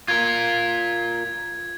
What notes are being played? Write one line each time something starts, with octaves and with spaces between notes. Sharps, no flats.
F4 A#4 G#6